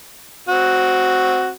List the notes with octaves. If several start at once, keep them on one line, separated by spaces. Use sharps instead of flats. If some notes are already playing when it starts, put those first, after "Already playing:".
C4 F#4